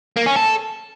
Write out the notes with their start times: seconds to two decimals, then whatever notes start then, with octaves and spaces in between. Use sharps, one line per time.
0.16 A#3
0.26 C#4
0.36 A4